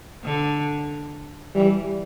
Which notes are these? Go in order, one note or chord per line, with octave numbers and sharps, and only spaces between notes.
D3
E3 G3